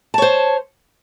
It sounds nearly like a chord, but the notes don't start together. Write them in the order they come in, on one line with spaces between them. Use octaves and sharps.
A5 C#5 C5